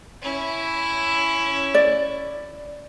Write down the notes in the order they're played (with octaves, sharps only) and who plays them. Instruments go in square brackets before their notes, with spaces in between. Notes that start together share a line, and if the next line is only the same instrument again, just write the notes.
[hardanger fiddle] C#4 E4
[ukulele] D5